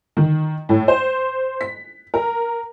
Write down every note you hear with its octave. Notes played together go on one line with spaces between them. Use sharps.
D#3
A2
C5
B6
A#4